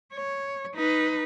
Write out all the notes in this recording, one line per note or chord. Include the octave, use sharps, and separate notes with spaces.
C#5
D#4 B4